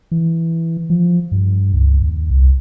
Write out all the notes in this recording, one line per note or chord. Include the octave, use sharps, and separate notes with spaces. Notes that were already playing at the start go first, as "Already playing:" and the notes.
E3
F3
G2
C#2
D#2
C2